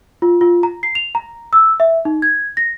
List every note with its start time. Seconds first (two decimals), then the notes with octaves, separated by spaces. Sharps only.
0.22 F4
0.41 F4
0.63 A#5
0.83 C7
0.95 F7
1.15 A#5
1.53 E6
1.80 E5
2.05 D#4
2.22 G#6
2.57 A#6